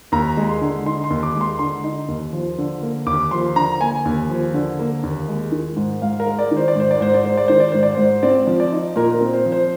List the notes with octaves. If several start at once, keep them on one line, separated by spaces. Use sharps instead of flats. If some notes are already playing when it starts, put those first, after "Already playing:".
D#2 A#5
G#3
C6
D3
D#4 C6
C6
D#2
D6
G#3
C6
D3 C6
D#4
D#2
F3
D3
A#3
D#2 D6
F3 C6
D3 A#5
A#3 G#5
D#2
F3
D3
A#3
D#2
G#3
D#3
G#2
G#2 F5
A#4
G#3
D5
D#3
C5
D5
G#2 C5
D5
G#2 C5
D5
G#3 C5
D5
D#3 C5
D5
G#2 C5
D5
G#2 C5
C4 D5
F3
D5
D#4
A#2 A#4
A#4
C4
C5
F3
C5